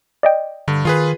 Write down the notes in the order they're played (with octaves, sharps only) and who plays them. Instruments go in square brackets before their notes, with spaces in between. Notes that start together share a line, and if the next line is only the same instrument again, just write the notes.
[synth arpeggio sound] D5 D#5 G5
[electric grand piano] G2 [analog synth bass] D3
[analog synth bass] D#3 [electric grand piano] F4 G#4 B4